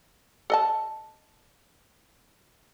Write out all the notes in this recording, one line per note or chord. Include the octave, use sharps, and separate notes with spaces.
A4 D#5 A5